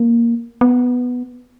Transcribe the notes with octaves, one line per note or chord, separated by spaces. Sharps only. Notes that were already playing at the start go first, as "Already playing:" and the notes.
Already playing: A#3
B3